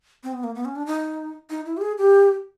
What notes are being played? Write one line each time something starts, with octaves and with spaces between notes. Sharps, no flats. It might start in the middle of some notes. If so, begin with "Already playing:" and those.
C4
B3
A#3
B3
C#4
D4
D#4
D#4
E4
G4
G#4
G4